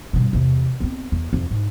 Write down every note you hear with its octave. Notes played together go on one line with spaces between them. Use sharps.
G2 B2
E2 C3
B3 C4
E2
F2
G#2